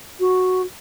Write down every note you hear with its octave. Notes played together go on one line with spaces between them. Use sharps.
F#4